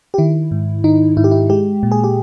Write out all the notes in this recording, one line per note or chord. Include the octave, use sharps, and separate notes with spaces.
G4
D#3 E4
G#2
D#3 D#4
G#2 E4
G4
E4
G#3 G4
A#2
G#4
G4